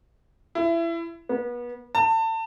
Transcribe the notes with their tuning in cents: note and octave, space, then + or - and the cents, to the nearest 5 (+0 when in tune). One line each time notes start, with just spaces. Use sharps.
E4 +25
B3 -30
A5 +30